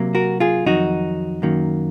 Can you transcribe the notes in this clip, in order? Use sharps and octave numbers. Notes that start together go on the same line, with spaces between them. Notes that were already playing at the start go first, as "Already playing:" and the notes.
Already playing: C3 F#3 A#3
F#4 A#4
F4 G#4
F2 D#3 F#3 D#4 F#4
F#2 D#3 F#3 A#3